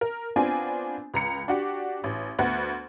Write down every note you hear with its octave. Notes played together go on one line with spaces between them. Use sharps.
A#4
B3 C4 D4 F4 G#5
C#2 A#5 C#7
D4 F#4 G4
A1
D2 B3 F#5